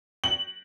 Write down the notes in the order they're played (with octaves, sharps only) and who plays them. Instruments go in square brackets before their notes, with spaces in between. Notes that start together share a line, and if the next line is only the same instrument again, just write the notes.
[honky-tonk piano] F#7